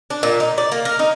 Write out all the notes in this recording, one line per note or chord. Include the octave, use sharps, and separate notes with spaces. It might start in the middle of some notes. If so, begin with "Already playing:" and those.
D4
A#2
D#4
D5
A#3
A#4
D#4